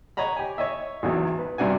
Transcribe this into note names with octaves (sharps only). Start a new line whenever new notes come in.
C#5 D#5 F#5 A#5 B5
G4 G#5
C#5 D#5 E5
G#1 E2 F#3
B4
G2 C3 D4 F#4 G#5